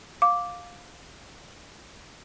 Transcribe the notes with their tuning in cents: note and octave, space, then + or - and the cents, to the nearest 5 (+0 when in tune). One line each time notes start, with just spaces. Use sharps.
F5 +15 D6 -5